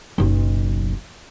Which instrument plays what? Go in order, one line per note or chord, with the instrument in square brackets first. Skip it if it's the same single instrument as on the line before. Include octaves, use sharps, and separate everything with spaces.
[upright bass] F#1 B1